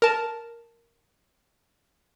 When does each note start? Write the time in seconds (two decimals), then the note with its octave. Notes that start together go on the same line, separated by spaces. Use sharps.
0.02 A#4 A5